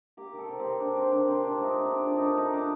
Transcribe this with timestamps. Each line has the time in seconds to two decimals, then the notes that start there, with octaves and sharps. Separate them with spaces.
0.17 A#3 G4
0.33 D#3 A4
0.49 C3
0.59 C4
0.65 C3
0.80 A#3 D4
0.96 D#3 C4
1.11 C3 D4
1.27 C3 C4
1.43 A#2 D4
1.58 A3
1.64 D#4
1.75 A3
1.85 D4
1.91 A#2
2.06 A#2 D4
2.17 D#4
2.22 A3 D4
2.37 A3 D#4
2.53 A#2 D4